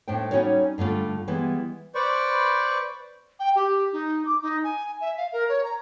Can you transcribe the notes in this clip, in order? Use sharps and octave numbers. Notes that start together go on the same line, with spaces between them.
A2 A3 D4 C5 G5
G3 C#4 D#4 F#4 C#5 D5
G2 D3 A3 F4
E3 G3 G#3 B3
B4 C5 D5 C#6
G5
G4
D#4
D6
D#4
G#5
E5
F5
A#4
C#5
A#5